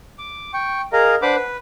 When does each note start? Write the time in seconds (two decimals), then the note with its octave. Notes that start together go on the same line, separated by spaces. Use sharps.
0.18 D6
0.54 G5 C#6
0.93 G#4 A#4 D#5 F5 A#5
1.22 D4 B4 C5 F#5 B5 D6
1.36 B4